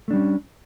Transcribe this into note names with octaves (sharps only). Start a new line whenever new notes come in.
G3 A3 C#4 D4